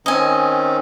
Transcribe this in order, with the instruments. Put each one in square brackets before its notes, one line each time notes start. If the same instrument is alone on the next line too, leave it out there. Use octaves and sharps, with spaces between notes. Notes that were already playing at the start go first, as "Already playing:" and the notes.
[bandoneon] D#3 C4 C#4 [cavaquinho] D#5 G#5